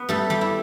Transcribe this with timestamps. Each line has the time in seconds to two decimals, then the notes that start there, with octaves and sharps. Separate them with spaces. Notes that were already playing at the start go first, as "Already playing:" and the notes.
Already playing: B3 B4
0.09 G3 A3 A4
0.30 G3 G4
0.41 E4